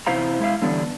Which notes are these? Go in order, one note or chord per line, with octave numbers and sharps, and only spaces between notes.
E2 C3 E4 C5 F5 A#5
G#3 E4 E5 F5
D3 E3 G3 B3 D4